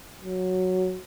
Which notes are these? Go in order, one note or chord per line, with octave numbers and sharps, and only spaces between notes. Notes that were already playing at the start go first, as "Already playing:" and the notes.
F#3